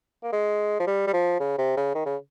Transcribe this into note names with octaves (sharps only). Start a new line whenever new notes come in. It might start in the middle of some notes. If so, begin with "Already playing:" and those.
A#3
G#3
F3
G3
G3
F3
C#3
C3
C#3
D#3
C#3